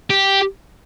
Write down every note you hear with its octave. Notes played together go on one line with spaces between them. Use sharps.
G4